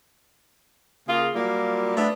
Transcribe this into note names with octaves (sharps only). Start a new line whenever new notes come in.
C#3 A#3 F4 G#4
F#3 G3 A#3 F4
A3 B3 D4